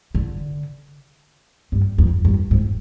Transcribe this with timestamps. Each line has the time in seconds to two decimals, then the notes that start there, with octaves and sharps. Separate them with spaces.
0.15 D3
1.72 G2
1.98 F2
2.25 G2
2.51 G#2